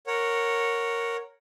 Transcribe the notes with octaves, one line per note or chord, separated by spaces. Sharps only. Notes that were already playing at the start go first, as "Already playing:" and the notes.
A#4 C#5 F#5